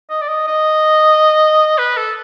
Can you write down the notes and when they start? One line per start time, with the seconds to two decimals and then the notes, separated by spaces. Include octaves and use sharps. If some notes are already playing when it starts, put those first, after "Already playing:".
0.10 D#5
0.21 D5
0.28 D#5
0.47 D#5
1.78 B4
1.97 A4